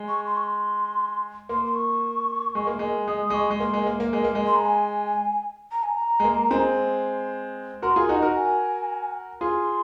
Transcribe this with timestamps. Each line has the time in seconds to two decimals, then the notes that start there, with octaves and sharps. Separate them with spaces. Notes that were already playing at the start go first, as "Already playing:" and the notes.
Already playing: G#3
0.08 C#6
0.27 C6
0.37 C#6
0.43 C6
1.49 A#3 C6
1.65 C6
1.75 C#6
2.55 G#3
2.67 A#3
2.79 G#3
3.08 G#3 D#6
3.26 D#6
3.30 G#3 C#6
3.50 G#3
3.60 A#3 C6
3.74 G#3
3.87 A#3
4.00 A#3
4.13 G#3
4.24 A#3
4.35 G#3
4.46 C6
4.56 A#5
4.65 G#5
5.72 A#5
5.83 G#5
5.94 A#5
6.20 G#3
6.24 A#3
6.51 G#3 C4
7.82 F#4 A#4 C6
7.96 F4 G#4
8.09 D#4 F#4 A#5
8.22 F#4 A#4
8.35 G#5
9.41 F4 G#4 C6